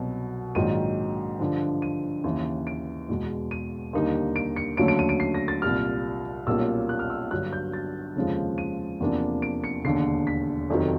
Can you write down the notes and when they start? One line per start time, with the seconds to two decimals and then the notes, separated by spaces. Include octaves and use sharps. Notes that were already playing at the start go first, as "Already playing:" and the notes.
Already playing: C2 B2 F#3
0.55 A#1 G#2 D#3 F#3 D#7
1.40 G2 D3 F3
1.82 D#7
2.24 D#2 C#3 E3
2.67 D7
3.09 E2 B2 G#3
3.51 D#7
3.93 D#2 D3 G3 A#3 D#4
4.36 D7
4.56 C#7
4.77 D#2 D3 F#3 A3 C#4 D7
4.88 D7
4.99 D#7
5.09 D7
5.20 C7
5.34 A#6
5.48 A6
5.62 C2 A#2 G3 F6
6.47 B1 A#2 G3 A#3 C#4 E6
6.89 F#6
6.99 F6
7.10 E6
7.31 G2 D3 F#3 F#6
7.53 G6
7.73 A6
8.16 F1 D#2 C#3 F3 G#3
8.58 D#7
9.00 E2 C3 F3 A#3 D4
9.42 D7
9.64 C#7
9.84 E1 D#2 D3 C7
10.27 B6
10.70 F1 F2 C3 D#3 F#3